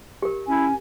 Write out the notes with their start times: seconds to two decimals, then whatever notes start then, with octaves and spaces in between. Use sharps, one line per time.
0.22 G4 A#4
0.47 C#4 E4 G#5